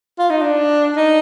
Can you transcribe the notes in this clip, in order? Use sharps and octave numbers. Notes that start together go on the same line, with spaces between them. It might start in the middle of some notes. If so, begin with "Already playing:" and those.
F4
D#4
D4
D#4